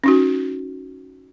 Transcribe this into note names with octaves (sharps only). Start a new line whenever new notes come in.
C#4 D#4 F#4